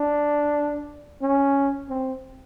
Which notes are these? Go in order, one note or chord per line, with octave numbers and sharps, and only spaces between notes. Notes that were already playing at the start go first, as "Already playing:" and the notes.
Already playing: D4
C#4
C4